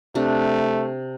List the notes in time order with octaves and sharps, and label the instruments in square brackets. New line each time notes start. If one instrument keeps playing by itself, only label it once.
[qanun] C3 D4 [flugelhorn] A3